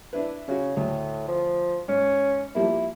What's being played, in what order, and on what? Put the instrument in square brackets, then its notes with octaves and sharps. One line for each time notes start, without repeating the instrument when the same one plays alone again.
[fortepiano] D4 E4 B4
[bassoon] C#3 [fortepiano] C#4 F#4
[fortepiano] D2 [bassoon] A2
[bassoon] F3
[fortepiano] G#2 [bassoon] C#4
[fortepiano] F3 G3 A#3 [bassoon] E4